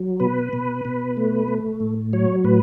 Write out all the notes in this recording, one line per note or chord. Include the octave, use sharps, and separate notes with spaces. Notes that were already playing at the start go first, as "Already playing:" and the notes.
Already playing: F#3
B2 B4
B2
B2
A3
A3
A2
F#3 C#5
A2 B4